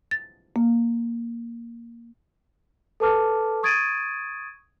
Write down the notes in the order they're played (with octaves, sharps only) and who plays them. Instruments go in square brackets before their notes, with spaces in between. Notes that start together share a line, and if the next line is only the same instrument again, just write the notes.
[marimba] A6
A#3
[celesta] A4 B4 A5 D6 F6
C#6 D#6 G#6 A6 D7 D#7